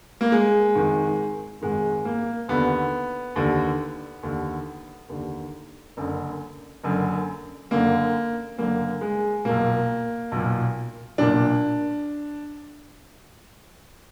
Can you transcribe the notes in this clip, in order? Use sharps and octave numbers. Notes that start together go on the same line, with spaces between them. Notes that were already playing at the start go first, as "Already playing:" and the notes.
A#3
G#3
G#1 G#2 D#3
G#1 G#2 D#3 G#3
A#3
D#2 D3 B3
D#2 D3
D#2 D3
D#2 D3
F#1 F#2 D3
F#1 F#2 D3
F#1 F#2 D3 A#3
F#1 F#2 D3 A#3
G#3
B1 A#2 A#3
B1 A#2
B1 A#2 D4